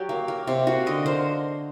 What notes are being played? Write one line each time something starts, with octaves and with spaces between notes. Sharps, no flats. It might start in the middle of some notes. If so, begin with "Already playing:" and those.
Already playing: F#3 G4
A#3
A#3
C3
A#3 F#4
D3 D#5
A#3 C5